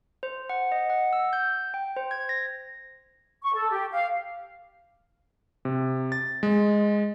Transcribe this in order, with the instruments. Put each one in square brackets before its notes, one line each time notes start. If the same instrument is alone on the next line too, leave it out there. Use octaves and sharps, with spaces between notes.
[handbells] C5
F#5
D#5
F#5
E6
G6
G5
C5
G#6
A#6
[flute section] C#6
A4
G4
F5
[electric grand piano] C3
A6
G#3